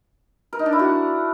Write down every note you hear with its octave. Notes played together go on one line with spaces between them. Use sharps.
A#4
D#4
D4
E4
F#4